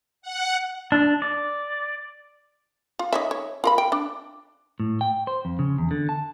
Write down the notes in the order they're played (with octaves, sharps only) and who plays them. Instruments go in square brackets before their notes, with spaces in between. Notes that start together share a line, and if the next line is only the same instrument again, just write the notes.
[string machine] F#5
[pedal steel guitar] D4
D5
[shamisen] F4
D#4 C#5 E5
C#5
F4 A#4 B5
G5
D4
[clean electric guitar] A2
G5
C5
F2
C#3
E2
D3
A5